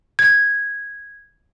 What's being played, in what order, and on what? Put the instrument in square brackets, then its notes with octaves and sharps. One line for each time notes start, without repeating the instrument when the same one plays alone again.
[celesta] G#6